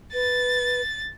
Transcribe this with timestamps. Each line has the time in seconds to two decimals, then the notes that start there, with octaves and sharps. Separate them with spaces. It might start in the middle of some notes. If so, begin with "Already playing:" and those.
0.14 B4 A6